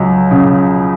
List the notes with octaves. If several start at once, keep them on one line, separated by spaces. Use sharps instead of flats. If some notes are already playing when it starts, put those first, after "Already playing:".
Already playing: C#2 F#3
C#3